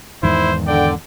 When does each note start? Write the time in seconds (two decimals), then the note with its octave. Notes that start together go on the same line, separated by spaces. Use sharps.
0.23 E2 G#2 D#3 E4 C5
0.67 D3 D5 G5